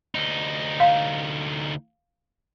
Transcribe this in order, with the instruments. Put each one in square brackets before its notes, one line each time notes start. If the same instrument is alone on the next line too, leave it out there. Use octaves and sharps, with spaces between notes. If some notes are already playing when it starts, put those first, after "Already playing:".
[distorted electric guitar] D2 D#4
[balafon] F5